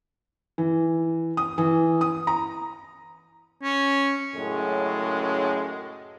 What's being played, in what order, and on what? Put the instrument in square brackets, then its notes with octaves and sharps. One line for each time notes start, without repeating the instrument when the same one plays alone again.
[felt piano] E3
D#6
E3
D#6
A#5
[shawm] C#4
[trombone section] F#2 A2 C#3 G#3